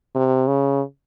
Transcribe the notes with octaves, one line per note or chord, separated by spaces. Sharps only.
C3
C#3